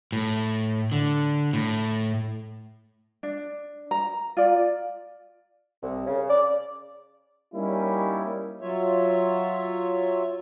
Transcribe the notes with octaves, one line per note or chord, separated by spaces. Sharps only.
A2
D3
A2
D4
A#5
F4 D5
C2
C#3
D5
G3 A#3 C#4 D#4 E4
F#3 F4 C#5 E5